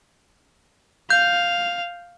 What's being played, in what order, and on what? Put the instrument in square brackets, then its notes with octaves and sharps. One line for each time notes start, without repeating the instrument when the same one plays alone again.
[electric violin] F5 [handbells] G6